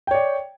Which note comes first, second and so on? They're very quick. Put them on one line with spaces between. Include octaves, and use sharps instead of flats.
G5 C#5 D5